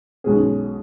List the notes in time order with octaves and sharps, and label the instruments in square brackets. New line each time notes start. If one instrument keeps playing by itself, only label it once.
[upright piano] B1 B2 G#3 C#4 G#4